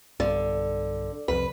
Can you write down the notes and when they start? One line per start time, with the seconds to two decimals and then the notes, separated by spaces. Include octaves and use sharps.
0.20 B1 G2 D3
1.28 C2 F2 B4